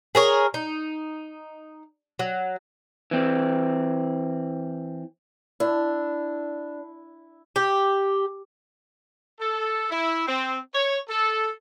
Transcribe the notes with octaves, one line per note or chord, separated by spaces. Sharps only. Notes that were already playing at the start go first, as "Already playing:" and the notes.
G#4 A#4 C#5
D#4
F#3
E3 C4
D4 E4
G4
A4
E4
C4
C#5
A4